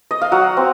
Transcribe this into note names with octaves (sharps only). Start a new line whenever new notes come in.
D#5
F5
F#3 F#5
C4